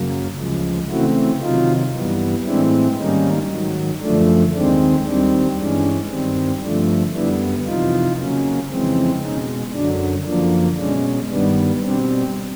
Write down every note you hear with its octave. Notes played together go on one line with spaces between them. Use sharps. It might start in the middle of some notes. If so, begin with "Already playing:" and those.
Already playing: F#2 C#3 F#3 A#3
D2 C#3 F3 G#3
C#3 E3 A3 C4 E4 F#4
C3 D#3 F#3 D#4 F4
G2 E3 G3 B3
A2 E3 G#3 C4 D4 E4
G#2 D#3 G3 A#3 C#4 D#4
G#2 D#3 F#3
F#2 D3 F3 A3 D4
D#2 D#3 G#3 C4 D4
D#2 D#3 G3 C4 D4
G2 E3 G#3 C#4 D4
G2 D#3 G3 C4
G2 D3 F3 A3 D4
F#2 D3 G3 B3 D4 E4
F2 C3 E3 D#4 F4
C#3 F#3 A#3 C#4
F2 C#3 E3 G#3 C4
B2 G#3 C#4 D#4
F#2 D3 F#3 D4
F#2 D3 F3 A#3 D4
B2 G#3 C#4 D4
G2 D#3 G3 B3 D4
B2 G3 C4 D4